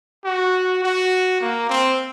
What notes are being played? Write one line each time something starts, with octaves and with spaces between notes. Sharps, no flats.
F#4
F#4
A#3
C4